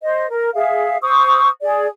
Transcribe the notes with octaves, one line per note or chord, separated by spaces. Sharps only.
C5 D#5
A#4
G#4 E5 F5
C5 C#6 D#6 E6
G#4 D5